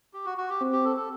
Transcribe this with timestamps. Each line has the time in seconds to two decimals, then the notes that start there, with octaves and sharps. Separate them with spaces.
0.13 G4
0.26 F#4
0.37 F#4
0.50 G4
0.61 C4
0.73 G4
0.84 A4
0.97 A4